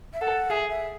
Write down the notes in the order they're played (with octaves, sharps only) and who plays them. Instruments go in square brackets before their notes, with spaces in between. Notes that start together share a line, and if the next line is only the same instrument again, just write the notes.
[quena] E5
[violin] A4 [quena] F#5
[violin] G#4 [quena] E5
[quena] E5